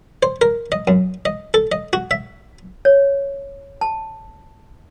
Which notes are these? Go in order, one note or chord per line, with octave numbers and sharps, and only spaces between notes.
C5
A#4
D#5
F#2
D#5
A4
D#5
F#4
E5
C#5
A5